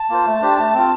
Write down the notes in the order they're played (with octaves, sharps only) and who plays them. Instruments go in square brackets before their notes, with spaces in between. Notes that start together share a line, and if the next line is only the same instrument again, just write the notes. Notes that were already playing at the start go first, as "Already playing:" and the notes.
Already playing: [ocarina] A5
[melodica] A#3 F4 C5
A3
D4 G4 C5
A3
C4 F4